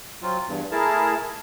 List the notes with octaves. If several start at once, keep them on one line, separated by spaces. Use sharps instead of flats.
F#3 C4 F4
E2 G2
A3 E4 G#4 A#4 A5